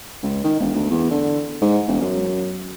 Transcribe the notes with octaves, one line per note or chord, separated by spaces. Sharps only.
C#2
D#3
E1
D2
E2
D3
G#2
E1
F#2